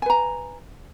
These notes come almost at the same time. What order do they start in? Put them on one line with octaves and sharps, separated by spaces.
G#5 B4 A#5